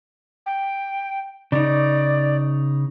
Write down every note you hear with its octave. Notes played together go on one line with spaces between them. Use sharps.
G5
C#3 D#4 D5